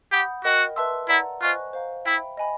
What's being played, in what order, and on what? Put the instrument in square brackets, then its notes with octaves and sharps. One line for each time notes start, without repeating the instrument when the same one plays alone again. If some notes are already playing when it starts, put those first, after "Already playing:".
[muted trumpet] G4 [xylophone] F#5 B5 D#6 G6
[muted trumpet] F#4 [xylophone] A#4 D#5 G5
[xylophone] B4 E5 A5 C6 E6
[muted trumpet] E4 [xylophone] D5 F#5 A#5
[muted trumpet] F4 [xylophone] C5 D#5 G#5 C#6 F#6
[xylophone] C5 F5 A#5
[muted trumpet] E4 [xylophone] E5 G5 B5
[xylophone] D#5 G#5 B5